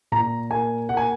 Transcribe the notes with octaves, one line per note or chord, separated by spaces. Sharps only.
A#2 A#5
A#3 G#5
A#3 F#5
G#5